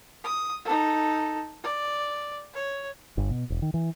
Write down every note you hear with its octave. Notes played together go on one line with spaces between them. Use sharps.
D#6
D#4 A4
D5
C#5
G1
B2
E1
D#3
E3